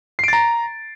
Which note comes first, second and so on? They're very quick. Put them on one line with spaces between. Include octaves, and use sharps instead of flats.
C7 D7 A6 A#5